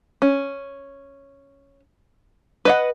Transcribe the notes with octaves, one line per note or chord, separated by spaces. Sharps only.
C#4
B4 D#5 F#5